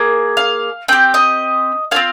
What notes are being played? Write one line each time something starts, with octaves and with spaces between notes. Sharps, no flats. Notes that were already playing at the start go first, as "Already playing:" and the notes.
Already playing: A#3 G#4
F5
C4 G4 G5
D#5
C4 F4 G#4 F5